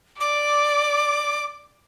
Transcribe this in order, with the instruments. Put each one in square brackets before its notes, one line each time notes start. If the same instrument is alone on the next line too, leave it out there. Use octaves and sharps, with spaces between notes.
[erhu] D5 [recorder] D6